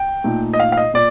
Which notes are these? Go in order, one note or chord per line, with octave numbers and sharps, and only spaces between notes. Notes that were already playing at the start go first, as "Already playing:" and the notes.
Already playing: G5
A#2 A3 D#4
D#5
F5
F5
D#5
A#2 D5